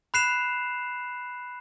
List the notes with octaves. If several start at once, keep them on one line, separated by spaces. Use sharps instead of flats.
B5 F#6 C7 E7 F7